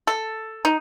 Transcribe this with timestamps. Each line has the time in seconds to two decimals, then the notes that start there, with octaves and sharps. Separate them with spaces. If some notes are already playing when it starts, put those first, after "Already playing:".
0.07 A4
0.65 D#4